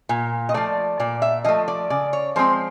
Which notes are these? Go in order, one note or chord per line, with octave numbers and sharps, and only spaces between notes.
A#2
D#5
F3 A3 D5
A#2 D5
E5
F3 A3 D#5
D5
C#3 D5
C#5
F3 G#3 C4 C5